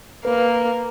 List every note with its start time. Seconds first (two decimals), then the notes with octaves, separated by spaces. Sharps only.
0.25 A#3 B4